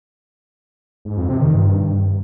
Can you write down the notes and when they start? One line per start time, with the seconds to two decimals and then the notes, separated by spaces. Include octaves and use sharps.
1.05 G#2
1.17 F2
1.29 C3
1.41 D#3
1.53 G2